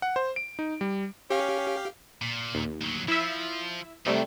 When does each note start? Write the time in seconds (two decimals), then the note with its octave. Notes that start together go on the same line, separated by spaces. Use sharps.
0.02 F#5
0.16 C5
0.36 D7
0.59 D#4
0.81 G3
1.30 C#4 G4 F5
2.22 A#2
2.54 D#2
2.81 D2 F#3
3.08 F3 E4 E5
4.06 C3 D#3 F#3 G3 A3